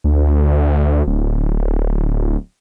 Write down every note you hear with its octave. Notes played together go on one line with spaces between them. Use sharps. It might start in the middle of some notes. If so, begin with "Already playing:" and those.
D2
D1